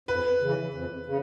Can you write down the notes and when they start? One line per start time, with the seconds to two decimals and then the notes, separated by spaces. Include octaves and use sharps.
0.08 F2 B4
0.41 C#3 E3
0.74 F2
1.06 C#3